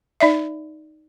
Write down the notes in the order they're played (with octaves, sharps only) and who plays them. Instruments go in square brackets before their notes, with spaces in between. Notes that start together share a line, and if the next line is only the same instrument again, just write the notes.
[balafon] D#4 D5 E5